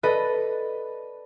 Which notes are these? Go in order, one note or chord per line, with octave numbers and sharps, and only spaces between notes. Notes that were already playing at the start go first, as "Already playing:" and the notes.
A4 B4 D5 D#5 B5